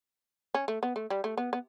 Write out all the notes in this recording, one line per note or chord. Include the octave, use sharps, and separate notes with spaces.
C#4
A3
B3
A3
G3
A3
B3
B3